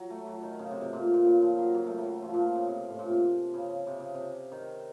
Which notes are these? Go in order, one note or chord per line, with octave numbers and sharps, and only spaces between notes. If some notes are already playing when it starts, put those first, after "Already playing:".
Already playing: F#3
A3
F#3
D#3
C#3
C3
C3
A#2
A#2
C#3
F3
F#3
F#3
A3
F#3
F3
A#2
C#3
C3
A2
A#2
C3
C#3
C#3
C3
C#3
C3
D#3